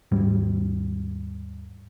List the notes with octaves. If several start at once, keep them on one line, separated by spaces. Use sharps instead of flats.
D#2 G#2 G3